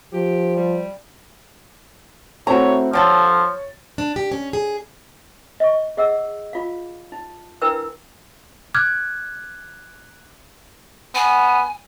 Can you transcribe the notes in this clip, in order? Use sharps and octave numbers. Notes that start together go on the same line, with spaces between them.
F3 G4
G3
E3 A3 C4 F#4 C#5 A#5
D3 F3 G3 A4 C#5 A6
D4
G4
C#4
G#4
D#5 C#6
G#4 D#5 F#5 E6
F4 F5
D#4
D4 E4 A#4 B4 G5 E6
D6 F6 F#6 G#6
B3 G#5